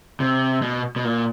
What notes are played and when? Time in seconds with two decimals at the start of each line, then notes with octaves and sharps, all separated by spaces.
0.20 C3
0.62 B2
0.96 B2
1.05 A#2